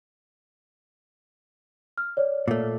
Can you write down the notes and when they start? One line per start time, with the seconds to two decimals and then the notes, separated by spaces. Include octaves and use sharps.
1.98 F6
2.17 C#5 D5
2.48 A#2 A3